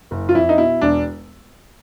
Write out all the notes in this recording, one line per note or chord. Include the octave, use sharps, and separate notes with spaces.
F#1
F4
F2 E4
D#4
B2 E4
E1 D4